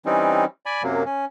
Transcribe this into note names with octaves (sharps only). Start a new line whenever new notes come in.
E3 G3 C4 C#4 D#4
D5 G#5 B5
F#2 C3 F#3 A#3
C#4